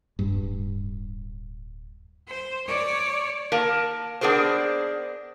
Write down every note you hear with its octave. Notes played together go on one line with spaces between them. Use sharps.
D1 G2
C5
C#5 D5
A#3 A#4 A5
B3 D4 G#4 A#4 C5